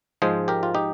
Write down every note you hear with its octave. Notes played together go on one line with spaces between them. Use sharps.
G#2 F3 G#3 G#4 C5
G4 A#4
F4
D#4 G4